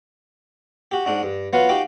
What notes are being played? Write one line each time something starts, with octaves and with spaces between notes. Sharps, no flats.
F#4 G4
G#2 D4 D#4 F#4
G2
F#3 B3 F4 F#4 B4 F5
D#4 F#4 G4 F5 G5 D6